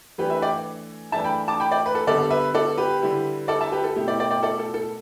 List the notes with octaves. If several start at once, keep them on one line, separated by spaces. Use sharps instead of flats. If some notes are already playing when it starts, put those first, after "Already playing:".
E3 A3 D4 G4 B4
B4 E5
D5 G5
E3 A3 D4 E5 A5
G5 B5
A5 D6
G5 B5
D5 G5
B4
A4
D3 G3 B3 A4 D5
B4 E5
A4 D5
G4 B4
D3 G3 E4
A4 D5
E5 A5
G4 B4
A4
B2 A3 E4 G4
D5 G5
D5 G5
D5 G5
A4 D5
A4
A4